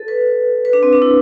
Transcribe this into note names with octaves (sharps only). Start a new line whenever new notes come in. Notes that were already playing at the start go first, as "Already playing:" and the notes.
Already playing: A4
B4
B4
D4
C4
D4
E4